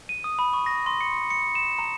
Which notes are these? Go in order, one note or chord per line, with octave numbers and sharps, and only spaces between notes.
D#7
D#6
B5
C#6
A#6
C6
C#7
C#7
E7
A#5